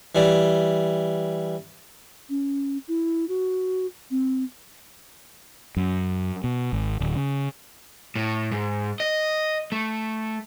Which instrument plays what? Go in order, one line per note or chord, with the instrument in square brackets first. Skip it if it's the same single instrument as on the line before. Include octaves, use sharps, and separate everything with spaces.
[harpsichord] E3 G3
[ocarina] C#4
E4
F#4
C4
[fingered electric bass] F#2
B2
G#1
D1
C#3
[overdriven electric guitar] A2
G#2
D#5
A3